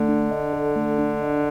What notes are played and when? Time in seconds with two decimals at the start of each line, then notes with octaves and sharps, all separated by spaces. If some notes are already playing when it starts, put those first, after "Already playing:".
Already playing: D3 A3
0.09 D4
0.31 D#5
0.53 A4
0.76 A3
0.99 D4
1.21 D#5